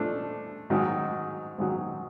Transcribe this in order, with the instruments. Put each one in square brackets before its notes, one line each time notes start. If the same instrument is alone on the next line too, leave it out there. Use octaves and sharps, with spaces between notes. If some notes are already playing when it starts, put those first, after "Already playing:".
Already playing: [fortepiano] F3 A3 D4
G#2 D#3 F#3
G#2 D#3 F#3